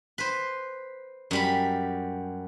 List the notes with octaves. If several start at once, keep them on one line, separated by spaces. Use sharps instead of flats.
B4 C5
F#2 G3 B5